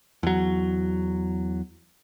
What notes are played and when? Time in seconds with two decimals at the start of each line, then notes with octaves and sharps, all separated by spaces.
0.23 E2 F#3